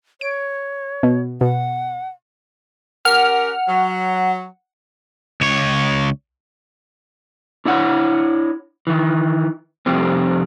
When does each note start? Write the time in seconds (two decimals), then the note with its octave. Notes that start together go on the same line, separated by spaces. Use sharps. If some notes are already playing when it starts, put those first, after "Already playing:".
0.21 C#5 D7
1.03 B2
1.41 B2 F#5
3.05 C#4 G4 A#4 F#5 F6
3.68 F#3
5.41 C#2 C#5
7.65 D4 E4 C#5 F#5
8.87 D#3 E3
9.86 F2 C3 G3 C4